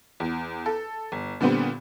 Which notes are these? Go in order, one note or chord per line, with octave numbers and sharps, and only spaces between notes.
E2
A4
G1
A#2 D3 G3 B3 C4